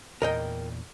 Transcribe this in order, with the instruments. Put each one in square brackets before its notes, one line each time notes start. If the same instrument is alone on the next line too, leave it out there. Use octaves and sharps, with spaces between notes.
[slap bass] E2 A#2 [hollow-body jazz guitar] A#4 D#5 G5